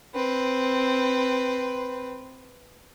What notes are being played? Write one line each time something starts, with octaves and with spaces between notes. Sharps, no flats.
C4 B4